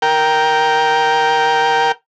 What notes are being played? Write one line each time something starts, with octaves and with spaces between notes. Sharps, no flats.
A#4 G5